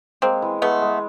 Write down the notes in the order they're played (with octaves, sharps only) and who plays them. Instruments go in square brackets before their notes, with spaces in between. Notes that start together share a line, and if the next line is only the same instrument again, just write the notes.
[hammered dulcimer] G#3 [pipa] A#3 C4
[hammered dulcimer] E3
[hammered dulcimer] G#3 [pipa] A3 B3
[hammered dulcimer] G#3